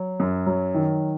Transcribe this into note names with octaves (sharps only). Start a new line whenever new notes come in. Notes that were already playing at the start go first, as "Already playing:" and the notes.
Already playing: F#3
F#2
F#3
D#3